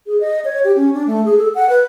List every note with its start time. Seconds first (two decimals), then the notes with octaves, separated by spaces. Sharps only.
0.07 G#4
0.21 D#5
0.45 C#5
0.64 G4
0.76 C#4
0.94 D4
1.07 A3
1.25 G#4
1.38 A4
1.55 F#5
1.69 B4